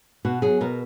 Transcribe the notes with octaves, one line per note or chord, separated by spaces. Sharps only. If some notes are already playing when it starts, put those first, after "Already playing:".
B2 F#4
F#3 G#4
B2 A#4